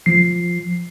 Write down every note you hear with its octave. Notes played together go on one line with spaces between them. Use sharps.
F3 C7